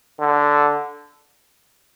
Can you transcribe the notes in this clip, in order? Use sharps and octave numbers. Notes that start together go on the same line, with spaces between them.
D3